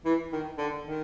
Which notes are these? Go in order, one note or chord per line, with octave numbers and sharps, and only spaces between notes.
E3
D#3
D3
D#3